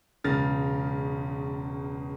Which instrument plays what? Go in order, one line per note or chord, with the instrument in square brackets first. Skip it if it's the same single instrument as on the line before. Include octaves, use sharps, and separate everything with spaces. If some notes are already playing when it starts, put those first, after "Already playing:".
[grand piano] E1 C#2 C#3 F6 A6 A#6